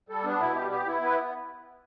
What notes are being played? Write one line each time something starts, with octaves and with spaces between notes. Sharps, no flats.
G3 A4
B3 D4
B2 E4
G3 G4
B3 G4
B3 E4
B3 B4